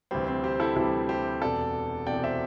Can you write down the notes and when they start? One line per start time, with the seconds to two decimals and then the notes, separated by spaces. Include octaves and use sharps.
0.11 D2 C3 E3 G3 C4
0.28 C4
0.43 G4 C5
0.60 E4 A4
0.76 D2 C3 E3 G3 E4 A4
1.09 G4 C5
1.42 E1 E2 C3 A4 D5
2.07 E1 E2 C3 D5 G5
2.23 C5 E5